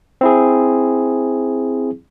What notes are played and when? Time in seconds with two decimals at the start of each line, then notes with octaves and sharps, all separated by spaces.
0.21 C4 E4 G#4